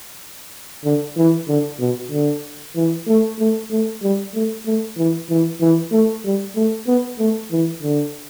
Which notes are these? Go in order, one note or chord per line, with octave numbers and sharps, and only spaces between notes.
D3
E3
D3
B2
D3
E3
A3
A3
A3
G3
A3
A3
E3
E3
E3
A3
G3
A3
B3
A3
E3
D3